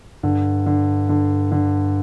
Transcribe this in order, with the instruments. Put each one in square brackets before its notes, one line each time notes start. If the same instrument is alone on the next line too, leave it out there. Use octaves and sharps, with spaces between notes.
[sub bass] G2 [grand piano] D3
[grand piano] D3
D3
D3